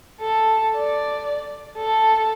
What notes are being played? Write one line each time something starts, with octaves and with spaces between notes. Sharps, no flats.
A4
D5
A4